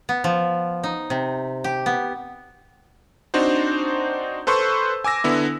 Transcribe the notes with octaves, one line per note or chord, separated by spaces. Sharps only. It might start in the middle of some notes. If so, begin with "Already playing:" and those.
B3
F3
D#4
C3
G4
B3
C4 D4 D#4 F#4 C5
A4 B4 C5 C6 C#6 E6
G#5 D6 E6 A#6
D3 B3 E4